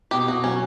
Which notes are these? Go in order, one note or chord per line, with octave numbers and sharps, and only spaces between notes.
B2 G4
B2 F#4
F#3 C#4